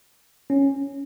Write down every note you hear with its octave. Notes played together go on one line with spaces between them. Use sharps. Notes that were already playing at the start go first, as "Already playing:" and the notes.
C#4